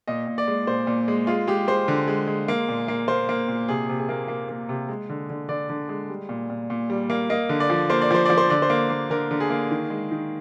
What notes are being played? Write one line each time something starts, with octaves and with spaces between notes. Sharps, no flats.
A#2 D#5
A#2
D5
G#3
A#2 C5
A#2
G#3
G#3 F4
G#3 G4
G#3 C5
D3
G#3
G#3
A#3
A#2
A#3
A#3 C5
A#3
A#2
C3 G#4
C3
G#4
A#3
A#3
A#3
C3
G#3
D3
D3
D3 D5
D3
G#3
G3
A#2
A#2
A#2
G3
A#3
A#3 D#5
D3
D5
F3
A#3 C5
D5
F3 C5
F3 D5
C5
D3 D5
C5
A#3
A#3
D3 A#4
D3
G#4
A#3
D#3
G#3
D#3